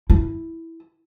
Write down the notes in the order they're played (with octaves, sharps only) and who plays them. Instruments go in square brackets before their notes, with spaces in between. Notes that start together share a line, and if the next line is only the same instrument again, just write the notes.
[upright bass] E4